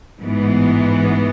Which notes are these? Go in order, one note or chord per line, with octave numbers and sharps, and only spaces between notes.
A1 G#2 E3 G#3 B3